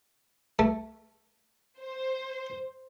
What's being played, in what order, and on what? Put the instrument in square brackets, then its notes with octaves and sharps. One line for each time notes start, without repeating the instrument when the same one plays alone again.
[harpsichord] A3
[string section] C5